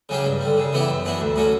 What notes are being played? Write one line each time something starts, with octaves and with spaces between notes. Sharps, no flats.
C#3 F#3 C#4 G4
G2
D3 G3
C#3
E3 B3 E4 G4
F#2
E3 B3 D4 F#4
D2
D3 F#3 C#4 F#4